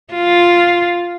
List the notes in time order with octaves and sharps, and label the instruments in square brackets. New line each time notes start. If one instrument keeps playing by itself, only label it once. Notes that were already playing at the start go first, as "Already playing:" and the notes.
[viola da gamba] F4